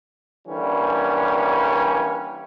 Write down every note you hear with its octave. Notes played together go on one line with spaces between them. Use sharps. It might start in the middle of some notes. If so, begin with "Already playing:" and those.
D3 E3 G3 A#3 C#4